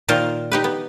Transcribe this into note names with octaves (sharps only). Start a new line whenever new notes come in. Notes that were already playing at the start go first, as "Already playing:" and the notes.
A#2 D#3 F4 A#4 C5
D#4 G4 B4
B3